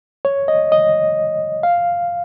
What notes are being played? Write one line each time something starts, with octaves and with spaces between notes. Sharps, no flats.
C#5
D#5
D#5
F5